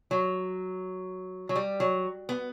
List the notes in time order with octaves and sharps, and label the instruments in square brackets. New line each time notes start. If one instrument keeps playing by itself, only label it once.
[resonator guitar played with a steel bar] F#3
F#3
G3
F#3
B3